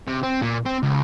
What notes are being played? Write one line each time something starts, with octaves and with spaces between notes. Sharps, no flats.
C3
C4
A#2
C4
C#2